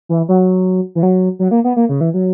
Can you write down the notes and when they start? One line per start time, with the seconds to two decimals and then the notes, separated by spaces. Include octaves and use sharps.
0.09 E3
0.28 F#3
0.95 E3
1.03 F#3
1.39 F#3
1.51 A#3
1.64 B3
1.76 A#3
1.89 C#3
2.01 E3
2.14 F#3